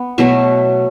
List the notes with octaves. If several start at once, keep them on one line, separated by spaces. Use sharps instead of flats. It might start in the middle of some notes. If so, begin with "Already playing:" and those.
Already playing: B3
B2 F#3 A3 E5